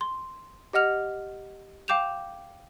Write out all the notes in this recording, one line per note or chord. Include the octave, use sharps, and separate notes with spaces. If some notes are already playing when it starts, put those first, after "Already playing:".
C6
G4 D#5 F#5 F6 F7
F5 G5 D6 G6 E7 F7